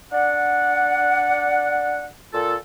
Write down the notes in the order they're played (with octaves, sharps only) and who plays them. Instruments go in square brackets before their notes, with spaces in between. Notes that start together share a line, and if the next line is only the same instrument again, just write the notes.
[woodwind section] D4 D5 F#5
A#2 F4 A4